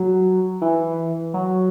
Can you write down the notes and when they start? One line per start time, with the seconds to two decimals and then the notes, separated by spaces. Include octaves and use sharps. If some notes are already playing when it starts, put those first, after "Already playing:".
Already playing: F#3
0.62 E3
1.34 F#3